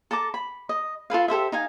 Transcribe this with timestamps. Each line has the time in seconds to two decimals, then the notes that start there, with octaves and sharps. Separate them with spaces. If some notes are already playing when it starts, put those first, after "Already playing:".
0.11 A4 A5 A#5 D6
0.34 B5
0.69 D#5
1.10 F4 A4 B4 F5
1.28 G4 A4 C5 E5
1.52 D#4 F5 G#5